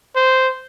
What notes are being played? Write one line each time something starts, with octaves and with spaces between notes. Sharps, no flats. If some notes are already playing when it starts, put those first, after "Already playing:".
C5